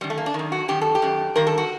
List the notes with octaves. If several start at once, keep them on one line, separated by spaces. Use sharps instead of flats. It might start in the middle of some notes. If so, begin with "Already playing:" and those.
F#2 D#3 G3
A3
A#3
D4
F#2 D#3
F#4
F#2 D#3 G4
A4
G4
F#2 D#3
G2 D#3 A#4
A4
F#4